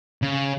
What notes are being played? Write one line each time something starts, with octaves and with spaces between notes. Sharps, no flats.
C#3